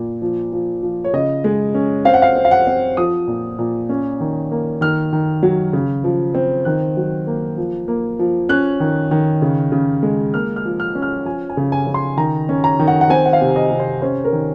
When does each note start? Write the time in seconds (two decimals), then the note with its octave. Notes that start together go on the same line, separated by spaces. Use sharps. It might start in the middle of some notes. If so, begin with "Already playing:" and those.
Already playing: A#2
0.22 F3
0.53 F3
0.83 F3
1.04 C#5
1.13 C#3 D#5
1.44 G#3
1.75 C#4
2.05 C4 F5
2.14 F#5
2.22 F5
2.36 C4
2.45 F5
2.51 F#5
2.67 C4
2.97 F3 D#6
3.28 A#2
3.59 A#2
3.89 C#4
4.20 D#3
4.51 A#3
4.81 D#3 F6
5.13 D#3
5.43 F#3
5.73 C#3
6.04 F3
6.35 C4
6.65 D#3 F#6
6.97 F#3
7.27 A#3
7.58 F3
7.88 A#3
8.19 F3
8.49 C#4 F#6
8.80 D#3
9.11 D#3
9.42 C#3
9.72 C#3
10.03 G#3
10.34 A#3 F6
10.56 F6
10.65 F3
10.80 F6
10.95 C#4
11.02 F6
11.25 F3 G#5
11.50 G#5
11.57 C#3
11.72 G#5
11.87 C#3
11.94 C6
12.17 D#3 A#5
12.49 C#4
12.64 A#5
12.79 D#3
12.88 F#5
13.01 F#5
13.10 C4 G#5
13.26 F#5
13.33 F5
13.41 C3
13.56 D#5
13.71 C3
13.80 C5
14.02 C#4 C5
14.24 A#4
14.33 D#3